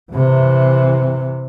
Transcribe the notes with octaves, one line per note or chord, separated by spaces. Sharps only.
C3 E3